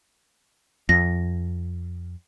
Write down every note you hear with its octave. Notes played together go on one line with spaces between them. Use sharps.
F2 A#6